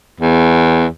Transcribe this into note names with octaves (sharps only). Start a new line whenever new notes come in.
E2